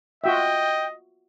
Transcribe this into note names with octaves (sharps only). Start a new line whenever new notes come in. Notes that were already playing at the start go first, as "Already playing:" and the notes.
F4 F#4 D#5 E5 G5